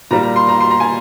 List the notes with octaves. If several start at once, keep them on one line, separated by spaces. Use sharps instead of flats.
A#2 G3 A#5
A#5
C6
A#5
C6
A#5
G#5